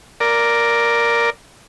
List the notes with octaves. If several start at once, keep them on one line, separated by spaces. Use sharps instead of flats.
A#4 D5